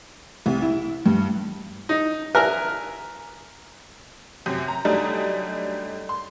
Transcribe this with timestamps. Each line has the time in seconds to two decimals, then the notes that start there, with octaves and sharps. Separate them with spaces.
0.46 C2
0.62 E4
1.06 G2
1.89 D#4
2.35 A#4 E5 G#5 F6 F#6
4.46 F#2 C3
4.68 A#5
4.85 F#2 G3 A3 D4 D#4
6.09 C6